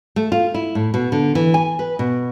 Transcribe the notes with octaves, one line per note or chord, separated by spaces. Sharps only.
A3
F4
E4
A2
B2
D3
E3
G#5
B4
B2